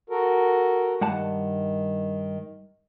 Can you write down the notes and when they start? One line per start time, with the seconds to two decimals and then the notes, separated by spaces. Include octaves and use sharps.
0.10 F#4 A4 A#4
1.01 G2 D#3 F#5 A5